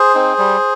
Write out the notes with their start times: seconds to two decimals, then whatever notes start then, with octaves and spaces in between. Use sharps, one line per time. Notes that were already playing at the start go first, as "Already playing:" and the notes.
Already playing: G#4 C5
0.15 C4 D#4
0.38 G3